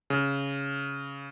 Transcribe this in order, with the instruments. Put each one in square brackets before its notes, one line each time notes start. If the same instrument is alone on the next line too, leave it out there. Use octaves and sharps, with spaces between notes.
[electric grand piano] C#3